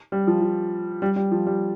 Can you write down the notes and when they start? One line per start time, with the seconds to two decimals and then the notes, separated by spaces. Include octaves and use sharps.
0.12 G3
0.27 F3
0.41 F3
1.02 G3
1.16 G3
1.32 F3
1.47 G3